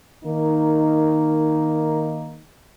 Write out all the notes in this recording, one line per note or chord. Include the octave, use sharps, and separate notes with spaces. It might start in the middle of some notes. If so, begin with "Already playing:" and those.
D#3 A#3 D#4